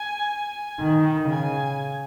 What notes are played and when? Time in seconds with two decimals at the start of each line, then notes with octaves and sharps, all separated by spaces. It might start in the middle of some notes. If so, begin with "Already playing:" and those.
Already playing: G#5
0.81 D#3
1.30 C#3 G#5